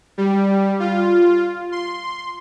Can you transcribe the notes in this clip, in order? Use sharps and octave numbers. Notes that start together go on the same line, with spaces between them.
G3
F4
C6